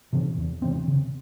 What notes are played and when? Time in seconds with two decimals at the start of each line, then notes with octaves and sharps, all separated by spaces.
0.13 C3 E3 C4
0.38 E2
0.62 C3 E3 C4
0.88 C#3